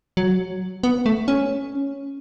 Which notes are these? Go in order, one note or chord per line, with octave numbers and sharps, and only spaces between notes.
F#3
B3
A3
C#4